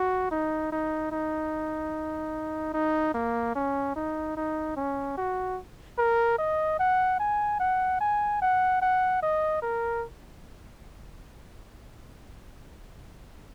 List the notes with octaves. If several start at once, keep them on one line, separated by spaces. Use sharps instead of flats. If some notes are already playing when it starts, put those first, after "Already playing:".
Already playing: F#4
D#4
D#4
D#4
D#4
A#3
C#4
D#4
D#4
C#4
F#4
A#4
D#5
F#5
G#5
F#5
G#5
F#5
F#5
D#5
A#4